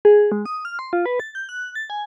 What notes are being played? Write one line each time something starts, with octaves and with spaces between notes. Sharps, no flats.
G#4
G#3
D#6
F6
C6
F4
B4
A6
G6
F#6
A6
G#5